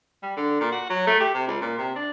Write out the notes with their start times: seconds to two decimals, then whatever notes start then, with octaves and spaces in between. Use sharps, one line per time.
0.23 G3
0.37 D3
0.60 A#2
0.72 F#4
0.90 F#3
1.07 A3
1.20 G4
1.34 C3
1.47 C#2
1.61 A#2
1.78 C3
1.96 D4